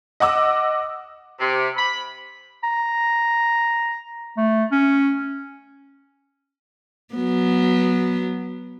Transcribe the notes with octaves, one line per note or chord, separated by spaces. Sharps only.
D#5 F#5 D6 E6
C3
B5
A#5
A3
C#4
F#3 B3